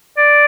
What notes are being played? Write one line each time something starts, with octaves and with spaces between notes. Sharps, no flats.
D5